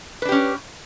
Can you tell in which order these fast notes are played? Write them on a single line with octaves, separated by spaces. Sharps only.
B4 D4 G4 C#4